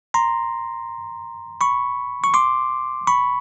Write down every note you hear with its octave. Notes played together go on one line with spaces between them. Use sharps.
A#5 C6
B5 C#6
C#6
C6 D6
B5 C#6